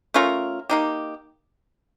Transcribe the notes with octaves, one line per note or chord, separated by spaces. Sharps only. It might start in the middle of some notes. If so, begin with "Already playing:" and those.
A3 C#4 F4 A#4
A#3 D#4 G4